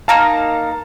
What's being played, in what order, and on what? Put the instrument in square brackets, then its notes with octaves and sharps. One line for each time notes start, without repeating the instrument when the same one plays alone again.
[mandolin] A#3 D#4 A#4 [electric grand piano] F5 A5